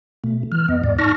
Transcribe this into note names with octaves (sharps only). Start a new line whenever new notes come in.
B2 A3
E3 F6
F2 B3 D#5
E2 G#2 D5
D#4 A5 C#6 F6 A#6